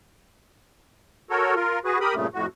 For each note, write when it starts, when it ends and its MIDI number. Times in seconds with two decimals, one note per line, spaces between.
1.30 1.55 66
1.30 1.55 69
1.30 1.55 70
1.30 1.55 73
1.56 1.79 65
1.56 1.79 70
1.85 1.99 66
1.85 1.99 68
1.85 1.99 71
2.01 2.15 67
2.01 2.15 70
2.01 2.15 83
2.01 2.15 87
2.15 2.27 43
2.15 2.27 46
2.15 2.27 49
2.15 2.27 57
2.34 2.46 41
2.34 2.46 45
2.34 2.46 66